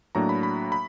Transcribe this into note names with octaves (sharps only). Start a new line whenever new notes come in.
A2 F#3 A#3 D4 A#5
B5
B5
B5